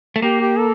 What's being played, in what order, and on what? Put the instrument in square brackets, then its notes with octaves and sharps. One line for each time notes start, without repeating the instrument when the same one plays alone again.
[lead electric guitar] A3
[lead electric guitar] A#3 [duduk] G4
[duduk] G4
A4